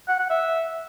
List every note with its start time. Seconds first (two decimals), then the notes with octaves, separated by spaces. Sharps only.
0.08 F#5
0.19 F#5
0.30 E5